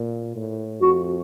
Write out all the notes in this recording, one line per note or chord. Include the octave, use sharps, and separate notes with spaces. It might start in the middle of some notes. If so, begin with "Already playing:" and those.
Already playing: A#2
A2
F2 F#4